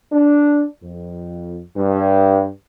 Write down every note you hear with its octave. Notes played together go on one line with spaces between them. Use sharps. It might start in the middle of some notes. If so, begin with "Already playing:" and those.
D4
F2
G2